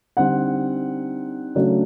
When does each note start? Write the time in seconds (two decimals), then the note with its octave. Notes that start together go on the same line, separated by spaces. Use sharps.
0.17 D3 G3 C4 D#4 F#5
1.55 C#3 F#3 A3 D4